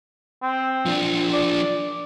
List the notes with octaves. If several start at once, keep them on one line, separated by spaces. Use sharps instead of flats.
C4
F3 D4
D5